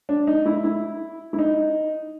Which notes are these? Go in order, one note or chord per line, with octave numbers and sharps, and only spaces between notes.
D4
D#4
E4
E4
E4
D#4